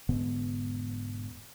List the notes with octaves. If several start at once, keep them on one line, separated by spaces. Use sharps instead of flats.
E1 G#2 D3 B3